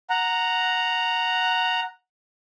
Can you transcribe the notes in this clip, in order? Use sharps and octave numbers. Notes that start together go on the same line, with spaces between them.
F#5 A#5